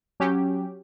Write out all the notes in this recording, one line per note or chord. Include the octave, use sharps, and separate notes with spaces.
F#3 C#4 G4